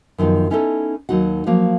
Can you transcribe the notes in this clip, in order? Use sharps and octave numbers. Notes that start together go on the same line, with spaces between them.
F#2 D#3 F3 B3 D#4
B3 C#4 D#4 E4 G4 A4
D#2 F#3 D#4 F#4 F#5
F3 F#3 A#3